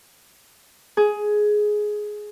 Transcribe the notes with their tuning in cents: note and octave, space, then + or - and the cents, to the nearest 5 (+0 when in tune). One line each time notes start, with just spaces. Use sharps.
G#4 +10